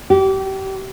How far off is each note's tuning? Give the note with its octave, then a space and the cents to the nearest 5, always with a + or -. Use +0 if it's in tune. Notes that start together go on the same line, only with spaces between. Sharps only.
G4 -30